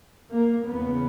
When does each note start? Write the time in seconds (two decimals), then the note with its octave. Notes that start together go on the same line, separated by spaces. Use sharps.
0.30 A#3
0.67 E2 C#3 B3